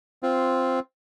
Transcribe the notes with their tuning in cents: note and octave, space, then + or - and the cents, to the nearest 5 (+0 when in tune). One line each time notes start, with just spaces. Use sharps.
C4 +0 F4 +0